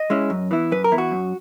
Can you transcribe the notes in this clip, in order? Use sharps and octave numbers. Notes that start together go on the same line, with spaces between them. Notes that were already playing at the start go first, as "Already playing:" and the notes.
Already playing: D#5
G#3 C#4 E4
F#2
E3 B3 E4
F#2 B4
A#4
E3 B3 E4
F#4
F#2